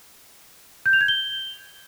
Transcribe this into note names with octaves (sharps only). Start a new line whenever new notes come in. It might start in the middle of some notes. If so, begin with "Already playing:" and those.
G6
F7
G#6
G7